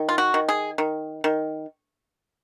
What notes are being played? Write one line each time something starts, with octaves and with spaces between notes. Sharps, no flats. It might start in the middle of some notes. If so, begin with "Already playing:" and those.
Already playing: D#3
F4
F#4
D#3
G#4
D#3
D#3